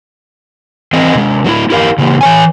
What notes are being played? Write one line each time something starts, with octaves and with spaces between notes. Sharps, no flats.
E3 C4 G#4 D#5
C3 G#3
F#3 A3 E4
E4 G4 A#4 F5
C#3 E3 A#3 G4
E3 C#5 G#5